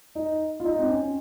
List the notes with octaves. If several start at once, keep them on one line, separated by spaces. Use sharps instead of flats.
D#4
F4
D#4
C4
C#4